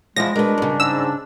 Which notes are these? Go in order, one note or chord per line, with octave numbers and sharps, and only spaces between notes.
E2 F3 G#3 E4 A#6
B2 G#3 D4 A#4 B4
G2 C#3
G#2 E6